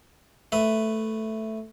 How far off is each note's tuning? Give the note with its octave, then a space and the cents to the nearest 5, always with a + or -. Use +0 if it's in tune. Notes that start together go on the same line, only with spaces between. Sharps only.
A3 +0 B4 +10 E5 +0